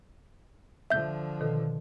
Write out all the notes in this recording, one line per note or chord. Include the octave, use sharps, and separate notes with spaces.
D3 F3 E5 G6
B2 D#3 A4